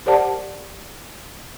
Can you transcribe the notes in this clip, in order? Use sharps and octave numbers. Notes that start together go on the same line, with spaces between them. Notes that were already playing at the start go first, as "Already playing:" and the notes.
G4 A#4 C5 D5 F#5 A5